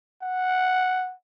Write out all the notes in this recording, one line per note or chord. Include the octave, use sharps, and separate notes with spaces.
F#5